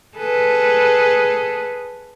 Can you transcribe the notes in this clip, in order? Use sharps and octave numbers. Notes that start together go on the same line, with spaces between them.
G#4 A4 B4